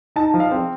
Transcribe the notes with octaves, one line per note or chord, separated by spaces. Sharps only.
D#4 A5
F3
F5
C4